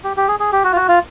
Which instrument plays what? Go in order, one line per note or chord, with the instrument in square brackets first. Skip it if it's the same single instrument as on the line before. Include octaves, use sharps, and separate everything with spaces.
[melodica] G4
G4
G#4
G#4
G4
F#4
F4
F#4
F4